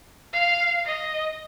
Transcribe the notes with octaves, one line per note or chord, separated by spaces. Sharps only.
F5
D#5